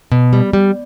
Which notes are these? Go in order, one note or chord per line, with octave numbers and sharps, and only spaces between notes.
B2
G3
G3